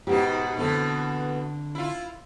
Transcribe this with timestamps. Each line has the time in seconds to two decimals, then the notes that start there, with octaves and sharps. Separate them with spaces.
0.07 G#2 B2 D#4 G4
0.57 B2 D3 E3 A3 C4 A4
1.75 E4 F4